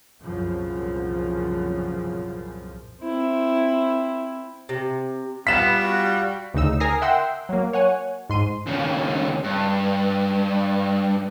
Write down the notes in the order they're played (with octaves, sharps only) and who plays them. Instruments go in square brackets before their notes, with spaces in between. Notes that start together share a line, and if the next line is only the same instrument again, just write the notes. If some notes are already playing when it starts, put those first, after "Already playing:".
[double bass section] C2 F#2 A#2 C#3 F3
[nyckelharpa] C4 E4
[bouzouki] C3
[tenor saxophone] G3 [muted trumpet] B3 [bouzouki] F4 [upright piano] B6 E7
[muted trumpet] F#4
[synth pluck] D2 C#3 D#4 E6
A#4 G#5 A#5 D#6 A#6 C7
E5 F#5 G5 C6 E6
F#3 A#3
C#5 F#5 G#5
G#2 C6 D#7
[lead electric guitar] D#2 C#3
G2